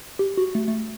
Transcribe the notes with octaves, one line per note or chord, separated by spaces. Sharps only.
G4
F#4
A3
A3